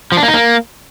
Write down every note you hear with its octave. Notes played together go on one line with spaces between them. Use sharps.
F3
D4
A#3
D#4
A#3